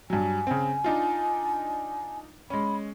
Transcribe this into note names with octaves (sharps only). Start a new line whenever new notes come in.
G2 F#3 G#5
C#3 C4
D4 D#4 F4
G#3 C#4 B5